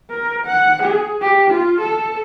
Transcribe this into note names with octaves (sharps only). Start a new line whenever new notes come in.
A#4
F#5
G#4
G4
F4
A4